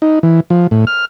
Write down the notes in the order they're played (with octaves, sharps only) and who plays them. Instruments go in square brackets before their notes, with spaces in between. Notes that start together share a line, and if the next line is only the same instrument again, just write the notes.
[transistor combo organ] D#4
E3
F3
A2
F6